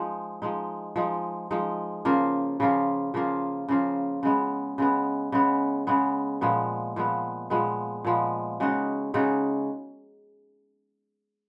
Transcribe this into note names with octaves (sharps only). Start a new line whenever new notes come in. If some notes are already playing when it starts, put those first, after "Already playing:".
Already playing: F3 G#3 D#4
F3 G#3 D#4
F3 G#3 D#4
F3 G#3 D#4
C#3 F3 A#3 F4
C#3 F3 A#3 F4
C#3 F3 A#3 F4
C#3 F3 A#3 F4
C#3 G#3 B3
C#3 G#3 B3
C#3 G#3 B3
C#3 G#3 B3
A#2 F3 G#3 B3
A#2 F3 G#3 B3
A#2 F3 G#3 B3
A#2 F3 G#3 B3
C#3 G#3 D#4 F#4
C#3 G#3 D#4 F#4